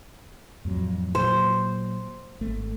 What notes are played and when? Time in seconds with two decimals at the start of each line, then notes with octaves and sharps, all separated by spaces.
0.65 F2 A2 F#3
1.15 A#2 F#3 C5
2.41 G#1 A3